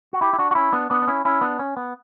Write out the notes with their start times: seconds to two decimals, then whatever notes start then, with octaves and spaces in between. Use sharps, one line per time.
0.13 F#4
0.21 E4 G4
0.33 E4
0.38 D4 F#4
0.51 F#4
0.55 C#4 E4
0.72 B3 D4
0.90 B3 D4
1.02 D4
1.08 C#4 E4
1.25 C#4 E4
1.41 B3 D4
1.59 C#4
1.77 B3